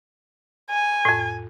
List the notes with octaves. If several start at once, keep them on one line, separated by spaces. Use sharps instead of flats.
G#5
F2 A2